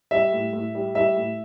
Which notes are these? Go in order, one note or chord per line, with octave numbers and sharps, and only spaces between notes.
G3 E5
A2
A2
G3
G3 E5
A2